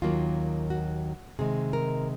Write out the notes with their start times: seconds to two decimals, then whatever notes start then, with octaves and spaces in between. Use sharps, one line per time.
0.02 D#2 D#3 F#3 A#3 F4
0.70 F#4
1.39 C3 D#3 G#3 G#4
1.73 A#4